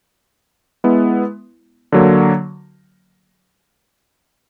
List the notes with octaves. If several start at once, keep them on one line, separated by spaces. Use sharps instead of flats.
G#3 B3 E4
D3 F#3 A#3